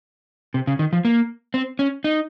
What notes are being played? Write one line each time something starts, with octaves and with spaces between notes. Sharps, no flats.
C3
C#3
D#3
F3
A#3
C4
C#4
D#4